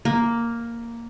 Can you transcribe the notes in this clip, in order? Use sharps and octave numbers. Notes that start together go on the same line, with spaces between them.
A#3